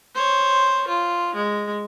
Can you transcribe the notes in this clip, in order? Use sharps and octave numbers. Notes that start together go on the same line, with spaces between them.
C5 C#5
F4
G#3